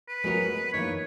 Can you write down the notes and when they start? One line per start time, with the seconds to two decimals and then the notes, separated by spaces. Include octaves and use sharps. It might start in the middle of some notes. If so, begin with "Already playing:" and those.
0.08 B4
0.24 G#3 B3 F#4 A#4 C#5
0.73 E3 A#3 D#4 C#5